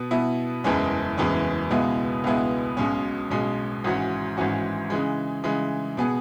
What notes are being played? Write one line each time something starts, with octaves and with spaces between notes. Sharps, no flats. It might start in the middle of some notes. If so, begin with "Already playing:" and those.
Already playing: B2 B3
B2 B3 E4
F#1 E2 E3 G#3 C#4
F#1 E2 E3 G#3 C#4
C#2 B2 G#3 B3 E4
C#2 B2 G#3 B3 E4
B1 B2 G#3 C#4
B1 B2 G#3 C#4
G#1 G#2 E3 C#4 F#4
G#1 G#2 E3 C#4 F#4
C#3 E3 G#3
C#3 E3 G#3
B2 B3 G#4